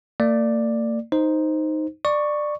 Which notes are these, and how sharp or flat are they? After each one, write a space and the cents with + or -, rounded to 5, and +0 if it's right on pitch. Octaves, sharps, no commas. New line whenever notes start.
A#3 -45 D5 +5
D#4 +0 C5 +0
D5 +15 C#6 +0